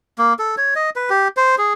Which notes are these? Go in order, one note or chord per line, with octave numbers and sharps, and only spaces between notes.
A#3
A4
C#5
D#5
B4
G4
C5
G#4